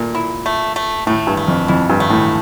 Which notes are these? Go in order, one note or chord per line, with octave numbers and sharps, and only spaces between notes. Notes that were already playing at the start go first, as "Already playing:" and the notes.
Already playing: A#2 A3
E4
A3
A3
A2 A3
G2
A3
F2
F2 E4
G2
A3
A2